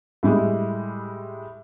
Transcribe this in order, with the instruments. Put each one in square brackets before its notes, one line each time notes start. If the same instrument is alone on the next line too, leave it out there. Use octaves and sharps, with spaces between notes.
[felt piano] A2 G3 G#3